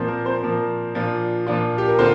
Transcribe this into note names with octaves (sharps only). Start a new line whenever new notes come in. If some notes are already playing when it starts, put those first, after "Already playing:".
Already playing: A#2 F3 A#3 C4 C5
A#4
C4 C5
A#2 F3 A#3
A#2 F3 D4 F4
A#2 F3 D4 F4
G4
A#4
D3 A#3 C4 F4 C5